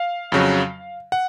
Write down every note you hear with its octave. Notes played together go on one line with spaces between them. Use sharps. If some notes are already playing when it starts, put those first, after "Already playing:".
Already playing: F5
F2 C#3 F#3
F#5